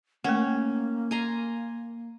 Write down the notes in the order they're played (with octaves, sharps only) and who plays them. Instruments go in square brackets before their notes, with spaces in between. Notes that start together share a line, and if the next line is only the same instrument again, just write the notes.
[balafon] A3 A#4 F#5 [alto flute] A#3 [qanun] C#4
[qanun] G#5 A#5 C6